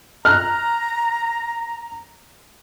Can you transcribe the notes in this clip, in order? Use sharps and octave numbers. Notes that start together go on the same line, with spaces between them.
A#5 F6 F#6